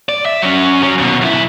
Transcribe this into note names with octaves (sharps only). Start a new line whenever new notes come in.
D5
E5
F#3 C#4
F#3 C#4
D#2 B2
B1 E4